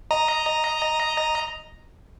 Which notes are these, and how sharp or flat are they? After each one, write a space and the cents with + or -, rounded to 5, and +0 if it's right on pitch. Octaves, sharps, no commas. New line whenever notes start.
D#5 +0 A#5 +0